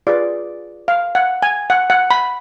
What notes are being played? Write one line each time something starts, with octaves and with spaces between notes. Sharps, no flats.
F4 G#4 B4 D5
F5
F#5
G#5
F#5
F#5
B5